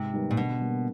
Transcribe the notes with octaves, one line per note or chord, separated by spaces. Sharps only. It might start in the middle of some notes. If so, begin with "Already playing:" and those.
Already playing: G#2 C3
D#3 G3 B3
A#2
B2 D3
G3 A#3